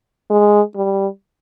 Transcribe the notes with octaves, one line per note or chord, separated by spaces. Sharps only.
G#3
G3